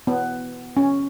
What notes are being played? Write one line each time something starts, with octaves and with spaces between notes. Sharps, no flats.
B3
C#4